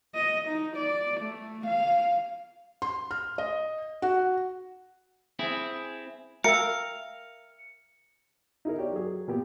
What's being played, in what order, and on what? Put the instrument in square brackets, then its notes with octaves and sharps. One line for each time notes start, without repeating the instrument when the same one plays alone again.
[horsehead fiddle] D#5
D#4
D5
A3
F5
[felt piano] C6
F6
D#5
F#4
[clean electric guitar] C4 E4 G#4
[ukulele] A#4 [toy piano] E5 G5 E6 [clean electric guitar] F5 [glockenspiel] C#7
[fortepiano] D#4 E4 G#4 A#4
G4 C#5 D5
F#3 G#4
A#2 B3 G4